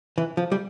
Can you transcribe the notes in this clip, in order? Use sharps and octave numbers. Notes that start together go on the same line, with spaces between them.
E3
F3
G3